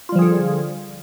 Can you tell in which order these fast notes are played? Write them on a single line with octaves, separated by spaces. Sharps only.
F4 G3 F3 G#4 D3